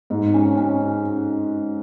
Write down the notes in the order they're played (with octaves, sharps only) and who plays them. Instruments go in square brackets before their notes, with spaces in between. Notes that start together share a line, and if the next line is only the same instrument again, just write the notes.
[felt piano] G#2
C#4
C#4